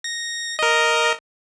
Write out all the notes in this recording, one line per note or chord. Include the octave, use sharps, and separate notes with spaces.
A#6
A#4 D#5